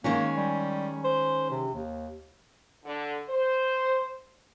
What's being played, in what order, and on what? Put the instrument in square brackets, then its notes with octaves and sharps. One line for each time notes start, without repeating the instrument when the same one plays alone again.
[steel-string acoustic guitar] D#3 G#3 C#4 [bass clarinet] A#3
[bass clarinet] G3
C5
C3
D#2
[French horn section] D3
C5